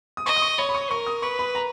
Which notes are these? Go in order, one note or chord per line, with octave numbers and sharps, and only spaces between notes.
D#6
D#5 C#6
D#6
C#6
C#5 B5
B5
C#6
A#4 C#6
D#6
B4 C#6
B5
A#5